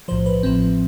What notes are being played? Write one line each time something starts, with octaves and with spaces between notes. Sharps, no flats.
B1 A2 F3 C5
B4
A1 A2 F3 C4